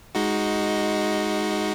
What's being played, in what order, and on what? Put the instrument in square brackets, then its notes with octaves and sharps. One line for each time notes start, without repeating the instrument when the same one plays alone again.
[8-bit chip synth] G#3 D#4 F#4